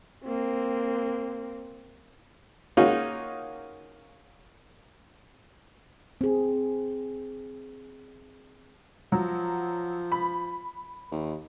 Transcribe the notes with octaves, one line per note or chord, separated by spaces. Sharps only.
A#3 C4
A#3 C#4 D#4 F4 F#4 G#4
C4 G#4
F3 F#3
B5
D#2